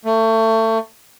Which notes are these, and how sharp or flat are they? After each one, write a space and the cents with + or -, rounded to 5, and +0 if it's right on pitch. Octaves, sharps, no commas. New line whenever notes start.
A3 +25